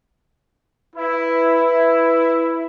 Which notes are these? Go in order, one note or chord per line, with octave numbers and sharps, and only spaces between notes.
E4 B4